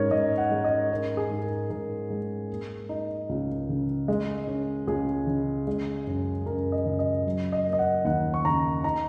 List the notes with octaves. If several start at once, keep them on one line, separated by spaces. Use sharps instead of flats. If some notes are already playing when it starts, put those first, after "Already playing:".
Already playing: G#2 C#4 A#4 C#5
G#2 D#5
F#5
G#3
D#5
C#4 A#4
G#4
G#2
A#4
G#2 A#4
G#3
A#3
D#4
C#2
C#3
G#3
C#4
C#2 G#4
C#3
G#3
F#2
F#2 A#4
D#5
C#3
D#5
F#3
D#5
A#3
D#5
F#5
D#2 F#5
C#6
C#3 A#5
D#4 A#5